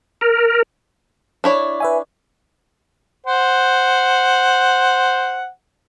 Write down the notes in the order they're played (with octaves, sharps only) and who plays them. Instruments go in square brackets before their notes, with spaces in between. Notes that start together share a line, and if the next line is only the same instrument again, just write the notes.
[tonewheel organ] A#4
[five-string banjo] D4 E4 C#5
[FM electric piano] B4 E5 G#5
[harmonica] C5 F#5